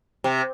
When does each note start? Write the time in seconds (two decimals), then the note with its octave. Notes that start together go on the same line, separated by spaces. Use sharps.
0.24 C3